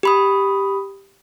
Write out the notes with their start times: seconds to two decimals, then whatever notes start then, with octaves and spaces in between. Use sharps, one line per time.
0.03 G4 B5 D#6